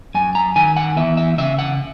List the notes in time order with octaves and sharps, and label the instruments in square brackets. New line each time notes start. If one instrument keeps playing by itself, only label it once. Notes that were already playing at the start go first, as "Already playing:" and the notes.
[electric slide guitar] F#2 G#5
A#5
D#3 G#5
F#5
E2 E5
E5
C#3 E5
F#5